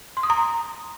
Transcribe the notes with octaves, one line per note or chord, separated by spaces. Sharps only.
C6
D#6
A#5